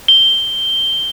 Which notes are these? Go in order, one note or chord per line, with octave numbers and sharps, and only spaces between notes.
G7